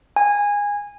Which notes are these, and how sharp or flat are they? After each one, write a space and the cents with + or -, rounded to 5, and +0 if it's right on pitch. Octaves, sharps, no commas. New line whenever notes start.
G#5 -20